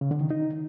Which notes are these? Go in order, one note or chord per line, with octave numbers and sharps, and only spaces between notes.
C#3
D3
D#3
D#4